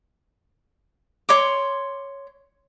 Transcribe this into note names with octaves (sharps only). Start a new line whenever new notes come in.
C#5 C6 D6